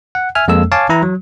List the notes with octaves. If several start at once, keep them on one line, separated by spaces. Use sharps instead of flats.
F#5
E5 G#5 F6
F2 G#3 A#3 A4 E6
C#5 F5 G#5 A5 D6
E3 E4 A#5
F#3